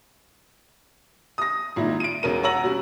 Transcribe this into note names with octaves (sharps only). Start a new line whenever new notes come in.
D#6 A#6
G#1 A#2 D#4 E4
D7 D#7
E1 B2 C#4 A#4 D#7
C#5 F#5 A#5 E6 A#6 F#7
B2 G3 C#4